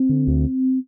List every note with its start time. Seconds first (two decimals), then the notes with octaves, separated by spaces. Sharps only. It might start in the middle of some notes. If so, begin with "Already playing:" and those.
Already playing: C4
0.09 D3
0.27 D2